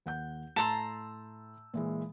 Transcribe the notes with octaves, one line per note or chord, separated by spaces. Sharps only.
D#2 F#5 G6
A2 A5 A#5 C6 E6
A#2 E3 G#3